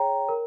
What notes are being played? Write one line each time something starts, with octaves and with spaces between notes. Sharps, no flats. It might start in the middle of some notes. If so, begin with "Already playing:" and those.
Already playing: G#4 C#5 G5 A#5
A#4